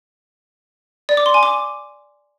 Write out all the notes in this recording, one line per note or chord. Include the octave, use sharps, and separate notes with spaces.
D5
D6
C6
G#5
D6